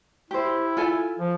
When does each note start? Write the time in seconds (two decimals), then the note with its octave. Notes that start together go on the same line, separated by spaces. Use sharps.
0.31 E4 G4 C5
0.77 F4 A4 G#5
1.19 F3